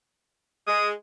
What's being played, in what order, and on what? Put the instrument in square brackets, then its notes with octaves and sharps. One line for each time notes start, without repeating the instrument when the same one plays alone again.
[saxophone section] G#3 [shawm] D#6